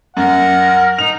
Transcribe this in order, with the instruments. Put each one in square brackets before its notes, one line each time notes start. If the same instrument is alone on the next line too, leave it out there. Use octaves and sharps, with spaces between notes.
[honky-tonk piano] F#2 [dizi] A#4 [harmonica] F#5
[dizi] D#4 [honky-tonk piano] F7